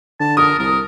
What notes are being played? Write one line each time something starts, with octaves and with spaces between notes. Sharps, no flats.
D3 A5
A#4 D#6
C2 A#4